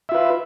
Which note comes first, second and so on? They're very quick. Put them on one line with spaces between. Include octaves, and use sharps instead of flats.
E5 F4 B4